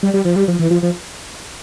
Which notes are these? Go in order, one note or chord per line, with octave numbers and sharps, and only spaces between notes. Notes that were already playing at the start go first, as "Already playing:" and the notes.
G3
G3
F3
G3
F3
E3
F3
F3